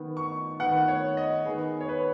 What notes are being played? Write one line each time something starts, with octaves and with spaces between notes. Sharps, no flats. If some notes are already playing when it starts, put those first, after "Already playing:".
Already playing: D#3 B3
C#6
D#3 B3 F#5
C#5
D#5
D#3 B3 G#4
C#5
B4